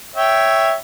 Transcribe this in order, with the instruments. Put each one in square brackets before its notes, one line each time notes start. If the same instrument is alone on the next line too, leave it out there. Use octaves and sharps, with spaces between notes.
[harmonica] C#5 E5 G5